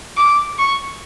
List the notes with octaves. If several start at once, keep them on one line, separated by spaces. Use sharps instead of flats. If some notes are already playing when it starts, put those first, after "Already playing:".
D6
C#6